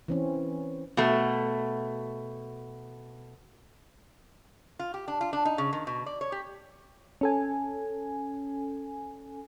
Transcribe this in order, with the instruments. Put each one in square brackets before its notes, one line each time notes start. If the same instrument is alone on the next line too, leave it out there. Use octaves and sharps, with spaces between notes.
[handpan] E3 C4 C#4
[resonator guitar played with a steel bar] B2 A3
F4
G4
D4
F4
D4
D#4
C#3
D#3
B2
D5
C#5
G4
[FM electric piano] C#4 A4 G#5